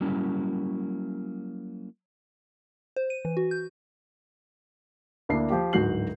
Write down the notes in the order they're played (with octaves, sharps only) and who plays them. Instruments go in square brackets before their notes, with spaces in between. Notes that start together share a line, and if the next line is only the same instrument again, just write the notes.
[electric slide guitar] F#3 G3 A#3 C#4 E4
[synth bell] C5
D#7
E3
F#4
G6
[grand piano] D2 A#3 D4 E4 C7
F3 G4
D1 G#2 F#4 G6 C7 F#7